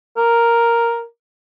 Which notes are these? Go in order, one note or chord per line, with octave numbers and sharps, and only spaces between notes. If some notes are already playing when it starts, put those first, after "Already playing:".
A#4